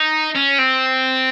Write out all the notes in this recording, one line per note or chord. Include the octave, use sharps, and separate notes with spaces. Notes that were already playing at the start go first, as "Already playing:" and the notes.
Already playing: D#4
C#4
C4